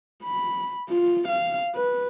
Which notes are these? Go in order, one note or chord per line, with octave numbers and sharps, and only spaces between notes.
B5
F4
F5
B4